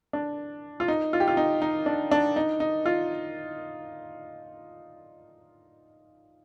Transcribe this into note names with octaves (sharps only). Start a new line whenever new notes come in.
D4
F4
D#4
F4
G4
F4
D#4
D#4
D4
D4
D#4
D#4
F4